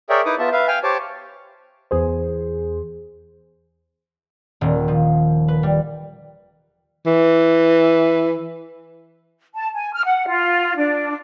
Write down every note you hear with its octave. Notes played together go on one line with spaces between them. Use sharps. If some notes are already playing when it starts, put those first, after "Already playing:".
G#4 A#4 C#5 D5 E5 G5
D#4 E4 B4 D6 D#6
B3 F4 E5 A5
B4 E5 F5
F5 G5 G#5 F6
G4 C5 C#5 A5 D6
E2 G#4 C5
D#1
F3
B4
G3
E3
A5
G#5
F6
F#5
F4
D4